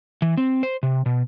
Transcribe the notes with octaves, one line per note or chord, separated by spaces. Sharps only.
E3
C4
C5
C3
B2